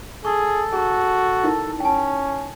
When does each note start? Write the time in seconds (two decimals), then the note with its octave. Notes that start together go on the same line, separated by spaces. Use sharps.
0.25 G#4 A4 C#6
0.72 F#4 G#4 A#5
1.44 D#4 E4 A#4
1.80 C#4 G5 A5